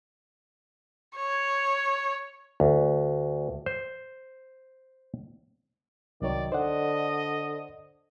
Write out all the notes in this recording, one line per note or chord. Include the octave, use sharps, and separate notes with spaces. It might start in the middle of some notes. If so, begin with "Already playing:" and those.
C#5
D2
C5
C2 D#3 F#3 C#5 D5
D3 C5 D5 D#5 F#5